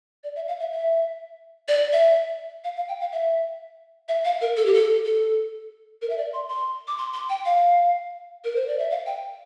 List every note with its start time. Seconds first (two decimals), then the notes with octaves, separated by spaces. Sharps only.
0.24 D5
0.36 E5
0.48 F5
0.60 E5
0.72 E5
1.68 D5
1.93 E5
2.64 F5
2.76 F5
2.88 G5
3.01 F5
3.12 E5
4.09 E5
4.25 F5
4.41 A#4
4.57 A4
4.66 G4
4.74 A4
5.05 A4
6.02 A#4
6.10 E5
6.18 D5
6.33 C6
6.50 C6
6.87 D6
6.98 C6
7.13 C6
7.29 G5
7.45 F5
8.44 A#4
8.56 C5
8.68 D5
8.79 E5
8.90 F5
9.06 G5